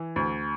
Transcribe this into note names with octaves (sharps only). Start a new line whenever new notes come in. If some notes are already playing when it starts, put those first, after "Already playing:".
Already playing: E3
D2